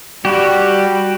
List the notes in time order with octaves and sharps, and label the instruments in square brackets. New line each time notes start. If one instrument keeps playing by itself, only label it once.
[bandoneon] G3 [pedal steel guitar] F#4 G4